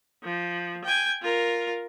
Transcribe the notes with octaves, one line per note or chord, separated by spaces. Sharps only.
F3
G5 G#5
F4 A#4